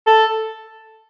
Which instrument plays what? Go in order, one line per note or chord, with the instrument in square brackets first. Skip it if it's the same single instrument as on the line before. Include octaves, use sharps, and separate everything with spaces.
[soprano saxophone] A4